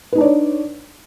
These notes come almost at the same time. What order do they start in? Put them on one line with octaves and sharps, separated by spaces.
B4 D#4 D4 D5 C#5